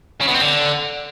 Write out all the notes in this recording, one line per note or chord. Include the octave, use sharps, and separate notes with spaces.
C#3
B2
C4
D3